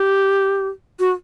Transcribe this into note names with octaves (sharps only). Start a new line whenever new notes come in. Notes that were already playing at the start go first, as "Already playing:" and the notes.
Already playing: G4
F#4